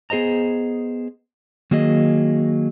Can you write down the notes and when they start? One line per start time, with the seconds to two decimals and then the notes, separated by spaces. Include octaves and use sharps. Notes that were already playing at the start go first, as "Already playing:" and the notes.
0.10 B3 G#4 C5 D#5 A#5
1.71 D#3 F#3 A#3 G#4 D#5